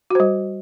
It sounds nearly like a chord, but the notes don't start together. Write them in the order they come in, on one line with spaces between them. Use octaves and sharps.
F#4 C5 G3